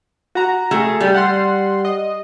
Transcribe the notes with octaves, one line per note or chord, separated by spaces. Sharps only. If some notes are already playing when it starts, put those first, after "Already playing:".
F#4 A#5
A3 G#4
G3 G4
F#5 C6
D#5